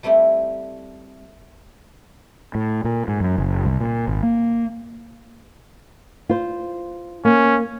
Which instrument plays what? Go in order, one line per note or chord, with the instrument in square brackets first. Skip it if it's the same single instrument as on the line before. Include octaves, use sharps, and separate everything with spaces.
[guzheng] G3 A3 C4 E4 G4
[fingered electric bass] A2
A#2
G#2
F#2
F#1
C2
A#2
G#1
A#3
[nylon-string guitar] F4 C5
[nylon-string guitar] A#3 [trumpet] C#4